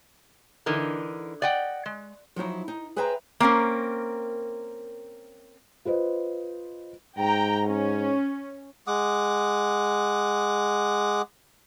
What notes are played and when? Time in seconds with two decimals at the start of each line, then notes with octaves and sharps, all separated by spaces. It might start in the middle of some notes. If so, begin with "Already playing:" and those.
0.66 D3 E3 D#4 A#4
1.42 D5 D#5 F#5 G5
1.86 G#3
2.36 F3 F#3 D#4 E4
2.68 D#4
2.96 G#4 B4 C5 E5 G5 A#5
3.40 A#3 C4 C#4 A#4
5.85 F4 B4 C5 D#5
7.18 G#2 G5 A#5
7.65 C#4
8.87 G#3 F#5 D6 D#6